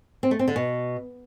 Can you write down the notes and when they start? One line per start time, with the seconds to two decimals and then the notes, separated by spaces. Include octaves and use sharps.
0.23 C4
0.31 A3
0.39 C4
0.48 D3
0.56 B2